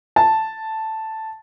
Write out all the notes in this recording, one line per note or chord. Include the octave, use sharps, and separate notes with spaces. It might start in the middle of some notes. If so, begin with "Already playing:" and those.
A5